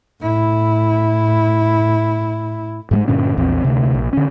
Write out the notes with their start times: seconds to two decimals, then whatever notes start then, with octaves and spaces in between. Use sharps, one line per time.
0.20 A2 E4
2.91 G#2 G3 G#3
3.08 G2 A#2 D3 C#4
3.37 A#1 E2 C4
3.64 D2 C3
3.94 A#1
4.13 D3 C#4